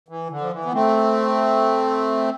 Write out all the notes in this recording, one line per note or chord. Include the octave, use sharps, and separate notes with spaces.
E3
D3
F3
E3
B3
A3 C4